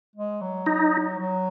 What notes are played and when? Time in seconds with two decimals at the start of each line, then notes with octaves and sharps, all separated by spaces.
0.15 G#3
0.41 F#3
0.66 D#4
1.18 F#3